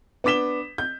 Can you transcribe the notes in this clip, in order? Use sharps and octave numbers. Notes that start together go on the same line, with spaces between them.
B3 D4 D6 B6 E7 G7
G6